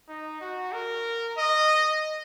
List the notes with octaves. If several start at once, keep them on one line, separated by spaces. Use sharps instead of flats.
D#4
F#4
A#4
D#5